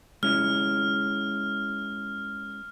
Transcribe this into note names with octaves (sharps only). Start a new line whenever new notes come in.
G#3 C#4 E4 F6